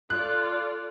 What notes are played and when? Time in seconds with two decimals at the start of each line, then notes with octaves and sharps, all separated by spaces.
0.10 F4 A4 D5 F#6